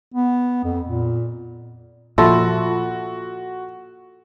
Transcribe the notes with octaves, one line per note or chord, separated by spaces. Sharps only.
B3
F2
A#2
A#2 F3 F4 F#4 A4 E5 C6